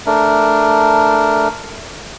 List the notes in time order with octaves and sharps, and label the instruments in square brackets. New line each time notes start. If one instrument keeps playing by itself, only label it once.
[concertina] A3 D4 A#4